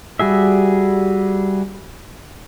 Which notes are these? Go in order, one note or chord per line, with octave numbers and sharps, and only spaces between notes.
G3 F#4 G#4 E5